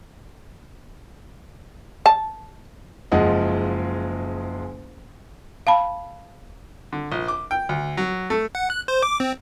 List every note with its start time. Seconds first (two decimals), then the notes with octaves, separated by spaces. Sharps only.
2.06 A5
3.12 F#1 F3 G#3 D#5 F#5
5.67 F5 A5 B5
6.93 D3
7.12 A#1
7.28 D6
7.51 G5
7.69 D2
7.97 F#3
8.30 A3
8.55 F#5
8.70 F#6
8.88 C5
9.03 D6
9.20 C4